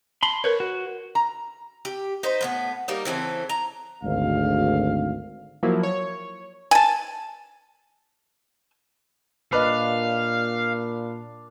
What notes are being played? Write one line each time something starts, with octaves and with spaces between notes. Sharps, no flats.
A5 B5 C6
A#4 B4 C#5
F#4
A#5
G4
D#4 B4 C5
A2 A#3 B3
G3 A#3 D#4
C#3 E3 C4 A4
A#5
G#1 D2 F5
F3 F#3 A#3 E4
C#5
G#5 A5
A#2 D4 B4 D#5 F5